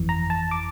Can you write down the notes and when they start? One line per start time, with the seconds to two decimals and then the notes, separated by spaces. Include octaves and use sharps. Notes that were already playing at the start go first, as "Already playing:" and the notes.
Already playing: G1 F2 E3
0.09 A#5
0.30 A5
0.51 D6